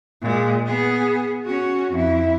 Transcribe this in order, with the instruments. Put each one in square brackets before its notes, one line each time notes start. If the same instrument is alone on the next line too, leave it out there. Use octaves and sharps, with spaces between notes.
[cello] A#2 G#3
B3 G#4
C#4 F#4
F2 E4